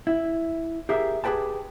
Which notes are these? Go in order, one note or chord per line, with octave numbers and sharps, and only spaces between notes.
E4
G4 G#4 A#4 E5
G4 G#4 B4 G5 A5